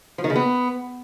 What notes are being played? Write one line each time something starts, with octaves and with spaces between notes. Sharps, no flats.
F3
D#3
C#3
B3